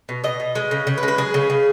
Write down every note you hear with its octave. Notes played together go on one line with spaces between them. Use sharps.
B2
B2 D#5
B2
G#3
C#3
C#3
B4
G#3
B4
F#3 G#4
C#3
C#3